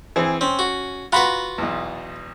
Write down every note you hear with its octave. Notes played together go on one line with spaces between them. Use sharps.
E3 C4 G#4
C4 C#4
F#4
F4 F#4 B4 F#5 A#5 B5
B1 E2